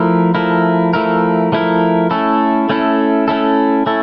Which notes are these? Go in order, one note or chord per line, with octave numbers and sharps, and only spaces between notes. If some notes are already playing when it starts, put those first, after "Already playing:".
Already playing: F3 A3 E4 A#4
F3 A3 E4 A#4
F3 A3 E4 A#4
F3 A3 E4 A#4
A3 C#4 E4 A4
A3 C#4 E4 A4
A3 C#4 E4 A4
A3 C#4 E4 A4